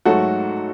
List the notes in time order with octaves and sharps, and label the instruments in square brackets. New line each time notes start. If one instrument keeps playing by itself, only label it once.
[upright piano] G#2 F#3 A3 F#4 A4